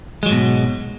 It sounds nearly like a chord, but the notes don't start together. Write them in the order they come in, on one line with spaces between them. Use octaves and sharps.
G#3 F#3 G#2 B2